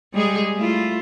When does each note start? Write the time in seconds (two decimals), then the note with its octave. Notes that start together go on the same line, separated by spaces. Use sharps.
0.13 G3 G#3 G#4
0.55 A3 E4 F4